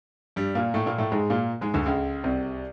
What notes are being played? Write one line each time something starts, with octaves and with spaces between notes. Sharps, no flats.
G2 G3
A#2 A#3
A2 A3
A#2 A#3
A2 A3
G#2 G#3
A#2 A#3
G#2 G#3
D2 D3
C#2 C#3
C2 C3